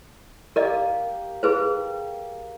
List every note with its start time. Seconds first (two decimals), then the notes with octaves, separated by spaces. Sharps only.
0.56 A#3 G4 A#4 D5 D#5
1.43 G#4 B4 C5